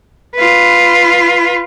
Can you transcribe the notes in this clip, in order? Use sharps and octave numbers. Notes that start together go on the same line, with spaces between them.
F4 B4